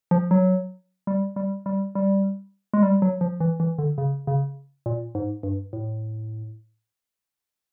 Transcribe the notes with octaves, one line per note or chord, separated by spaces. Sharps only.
F3
F#3
G3
G3
G3
G3
G#3
G3
F#3
F3
E3
E3
D3
C#3
C#3
A#2
G#2
G2
A2